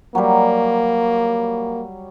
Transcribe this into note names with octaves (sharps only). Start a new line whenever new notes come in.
F#3 G3 A#3